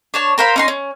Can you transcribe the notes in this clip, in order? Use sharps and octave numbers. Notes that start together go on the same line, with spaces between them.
D4 C#5 A5
A#4 C5 F5 B5
C#4 D#4 C6
C#4